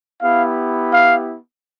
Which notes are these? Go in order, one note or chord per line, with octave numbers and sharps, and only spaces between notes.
B3 E4 G4 F5
F5